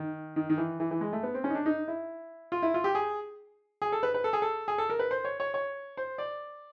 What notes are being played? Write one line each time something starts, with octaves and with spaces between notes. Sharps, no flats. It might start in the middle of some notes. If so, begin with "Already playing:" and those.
Already playing: D#3
D#3
D#3
E3
E3
E3
G#3
A3
B3
C4
C#4
D#4
D4
D#4
E4
F4
E4
F4
G4
G#4
G#4
A4
B4
B4
A4
G#4
A4
G#4
A4
A#4
B4
C5
C#5
C#5
C#5
C5
D5